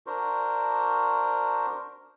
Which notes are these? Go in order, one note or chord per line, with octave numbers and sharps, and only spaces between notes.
D4 F#4 A#4 C5